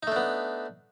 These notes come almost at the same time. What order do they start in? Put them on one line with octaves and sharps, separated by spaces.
D#4 A3 D4 B3